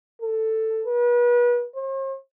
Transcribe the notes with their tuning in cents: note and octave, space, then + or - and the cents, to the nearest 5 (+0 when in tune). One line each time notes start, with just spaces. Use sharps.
A4 +10
B4 -35
C5 +45